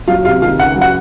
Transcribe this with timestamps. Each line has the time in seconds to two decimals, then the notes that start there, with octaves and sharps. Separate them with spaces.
0.08 F#3 F4 F5
0.25 C3 F4 F5
0.42 D#3 F4 F5
0.59 C#2 F#5
0.76 F#3
0.81 F#4 F#5